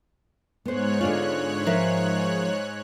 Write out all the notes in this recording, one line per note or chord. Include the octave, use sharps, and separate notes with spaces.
G#2 B3 C5 C#5 F#6
D3 D4 F4
F3 A#4 E5